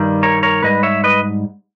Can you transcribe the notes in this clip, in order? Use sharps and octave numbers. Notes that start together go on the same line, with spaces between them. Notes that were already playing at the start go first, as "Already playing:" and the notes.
Already playing: G2 D#3 G3
A#4 C#5
A#4 C#5
G#2 G3 B4 D#5
C#5 E5
B4 D#5